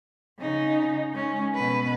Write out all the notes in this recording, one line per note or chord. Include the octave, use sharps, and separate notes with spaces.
C#3 D#4
G#3 C#4
B2 B4